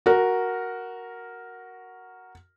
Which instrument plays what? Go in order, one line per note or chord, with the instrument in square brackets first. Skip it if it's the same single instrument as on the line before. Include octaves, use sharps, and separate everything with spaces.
[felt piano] F#4 A#4